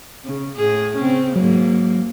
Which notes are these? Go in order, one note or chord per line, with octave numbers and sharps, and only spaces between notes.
C#3
A2 G#4
C#3 C4 C#4
G#2 F#3 A#3